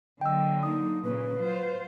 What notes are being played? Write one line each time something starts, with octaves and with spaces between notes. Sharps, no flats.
D3 F#3 A#3 D#5 G5 E6
D#4 D#6
A#2 C#3 A#3 B4
F#3 F4 C5